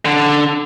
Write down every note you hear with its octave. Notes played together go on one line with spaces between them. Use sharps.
D3